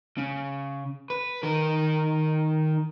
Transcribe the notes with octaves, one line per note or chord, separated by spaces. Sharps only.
C#3
B4
D#3 A#4